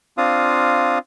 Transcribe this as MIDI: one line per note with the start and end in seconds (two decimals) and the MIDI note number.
0.18 0.98 60
0.18 0.98 62
0.18 0.98 65
0.18 0.98 77
0.18 0.98 87